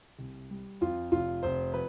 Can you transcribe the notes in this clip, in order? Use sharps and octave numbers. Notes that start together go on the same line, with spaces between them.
C2
G3
F2 F4
F1 F4
F1 C5
F3 B4